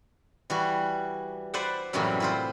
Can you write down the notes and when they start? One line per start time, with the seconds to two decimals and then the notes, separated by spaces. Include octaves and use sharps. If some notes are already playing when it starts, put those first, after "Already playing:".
0.50 E3 G3 F#4
1.54 B4 C5 D5 E5 F#5
1.93 F#2 A2 C3 E3 F#3 G3
2.20 E4 F4 C5